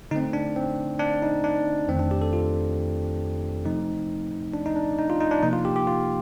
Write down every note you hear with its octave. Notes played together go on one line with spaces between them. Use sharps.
D3 A3 C4 D#4
D4
C4
D4
D#4
D4
F2 D#3 A3 C4
D4
G4
A4
F4
C3 F3 A3 C4 D#4
D4
D#4
D4
D#4
F4
D#4
D4
C3 F3 A#3 D#4
F4
G4
G4
F4